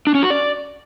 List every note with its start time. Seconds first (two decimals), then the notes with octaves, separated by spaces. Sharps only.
0.07 D4
0.15 C#4
0.22 F#4
0.30 D5